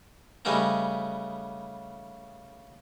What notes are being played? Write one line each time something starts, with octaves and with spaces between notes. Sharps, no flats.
C#3 G3 A3 B3 C#4 D#4